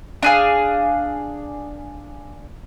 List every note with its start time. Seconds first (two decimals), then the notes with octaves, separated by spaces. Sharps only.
0.23 D4 G#4 F5